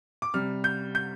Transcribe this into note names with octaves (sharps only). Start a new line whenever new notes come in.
D6
C3 G3 F6
G6
G6